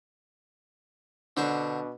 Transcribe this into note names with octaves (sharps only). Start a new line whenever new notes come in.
B2 D3 D4 C5 C#6